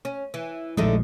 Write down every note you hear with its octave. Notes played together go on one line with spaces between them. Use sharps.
C#4
E3
A#1 D3 F3 G#3 A3 D#4